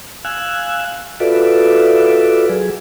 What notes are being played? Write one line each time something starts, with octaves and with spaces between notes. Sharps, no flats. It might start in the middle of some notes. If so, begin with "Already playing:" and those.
F5 G#5 E6 F#6
F4 F#4 A4 B4 D5 E5
F#3 G#4